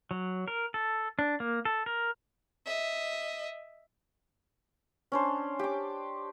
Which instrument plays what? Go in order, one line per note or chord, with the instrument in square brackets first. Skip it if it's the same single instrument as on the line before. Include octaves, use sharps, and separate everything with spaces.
[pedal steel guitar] F#3
A#4
A4
D4
A#3
A4
A#4
[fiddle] D#5 E5
[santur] C#4 D4 C5
G4 D6